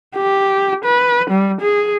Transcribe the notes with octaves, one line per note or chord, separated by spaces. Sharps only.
G4
B4
G3
G#4